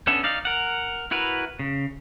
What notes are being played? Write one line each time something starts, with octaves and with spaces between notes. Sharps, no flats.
B3 C#4 D4 A4 E5
D#4 D5 F5
A#4 F#5
E4 F#4 A#4 B4
C#3